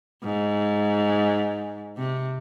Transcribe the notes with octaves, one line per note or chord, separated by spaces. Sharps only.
G#2
C3